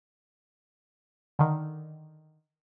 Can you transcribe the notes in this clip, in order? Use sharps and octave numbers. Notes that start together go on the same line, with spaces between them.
D3 D#3